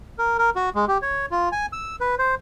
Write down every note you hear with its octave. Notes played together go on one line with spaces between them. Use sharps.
A#4
A#4
F#4
G#3
G4
C#5
F4
G#5
E6
B4
C5